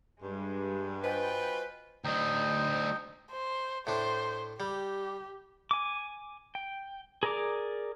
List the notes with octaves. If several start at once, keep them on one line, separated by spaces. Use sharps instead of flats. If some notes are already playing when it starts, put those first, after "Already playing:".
G2 G3 G#3
F4 F#4 B4 C5 D#5 G5 G#5
D2 F#3 D#4 G5
C5
A2 D4 C5
G3 G4
G#5 D6
G5
G#4 A#4 D5 A#5 D6